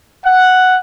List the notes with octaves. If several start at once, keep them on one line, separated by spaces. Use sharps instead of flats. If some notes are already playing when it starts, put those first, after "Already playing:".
F#5